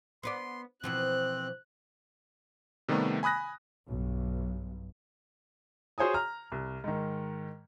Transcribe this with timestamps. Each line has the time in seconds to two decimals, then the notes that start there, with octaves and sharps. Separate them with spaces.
0.23 B3 B4 D5 C6
0.84 B2 E3 F3 C4 F#6
2.88 C3 D#3 G3 A3 B3
3.23 G#5 B5 D#6 F#6 A#6
3.87 B1 G2
5.98 F#4 G#4 C5 C#5 G#5 D#6
6.14 A#5 F6
6.52 C2
6.84 G#2 D#3